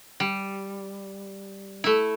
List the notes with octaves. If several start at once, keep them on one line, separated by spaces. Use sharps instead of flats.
G3
A3 E4